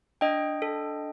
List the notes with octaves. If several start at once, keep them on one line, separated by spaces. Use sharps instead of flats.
D4 D#5 G5
A4